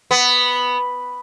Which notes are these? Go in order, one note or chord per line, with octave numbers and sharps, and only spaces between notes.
B3